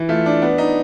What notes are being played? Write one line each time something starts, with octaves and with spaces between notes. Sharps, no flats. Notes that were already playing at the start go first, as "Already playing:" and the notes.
Already playing: E3
A3 F4
D4
B3
D#4